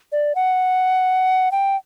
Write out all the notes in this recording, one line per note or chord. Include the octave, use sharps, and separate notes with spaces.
D5
F#5
G5